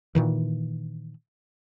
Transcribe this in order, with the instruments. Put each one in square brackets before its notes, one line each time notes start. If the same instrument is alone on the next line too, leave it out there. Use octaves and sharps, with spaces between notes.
[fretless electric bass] A#2 D#3 E3